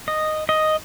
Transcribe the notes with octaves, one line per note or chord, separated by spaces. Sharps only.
D#5
D#5